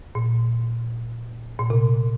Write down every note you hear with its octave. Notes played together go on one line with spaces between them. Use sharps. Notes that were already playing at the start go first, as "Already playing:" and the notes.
A#2
A#2
C3